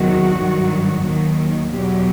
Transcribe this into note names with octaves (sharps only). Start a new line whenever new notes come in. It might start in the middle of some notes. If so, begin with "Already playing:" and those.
Already playing: E2 C3 D#3 F#3 F#4
G2 D#3 F#3
D#2 D#3 F#3
E2 B2 F#3 G4